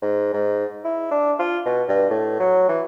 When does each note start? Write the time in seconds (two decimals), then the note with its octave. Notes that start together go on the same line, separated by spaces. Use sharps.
0.02 G#2
0.33 G#2
0.84 E4
1.11 D4
1.39 F4
1.66 B2
1.88 G2
2.10 A2
2.40 F#3
2.69 E3